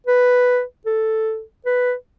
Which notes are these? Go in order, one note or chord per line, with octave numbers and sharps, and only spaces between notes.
B4
A4
B4